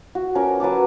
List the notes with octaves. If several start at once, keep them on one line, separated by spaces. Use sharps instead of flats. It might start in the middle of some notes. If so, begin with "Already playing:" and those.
F#4
F3 C#4 A#4 D6
F#3 B4 A5 D6